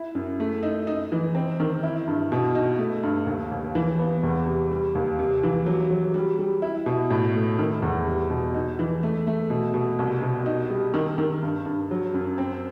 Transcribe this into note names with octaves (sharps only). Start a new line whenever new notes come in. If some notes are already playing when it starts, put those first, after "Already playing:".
Already playing: E4
F#2
A3
D#4
D#4
E3
C4
D#3
E4
G2
B2
D#4
A3
G2
D#2
D#2
E3
B3
E2
C3
G3
D#2
C3
E3
F#3
F#3
G3
G3
E4
B2
A2
A3
D#3
E2
G3
B2
D#4
E3
A3
A3
B2
B2
C2
B2
D#4
G3
D#3
D#3
G2
G2
F#3
F#2
C4